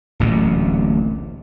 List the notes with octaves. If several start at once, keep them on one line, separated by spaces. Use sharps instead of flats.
D1 A1 A#2